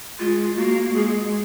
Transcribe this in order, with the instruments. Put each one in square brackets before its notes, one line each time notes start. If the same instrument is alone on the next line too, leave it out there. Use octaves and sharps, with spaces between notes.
[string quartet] G#3 [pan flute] F4
[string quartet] A#3 [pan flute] F#4
[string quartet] G#3 [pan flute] G#4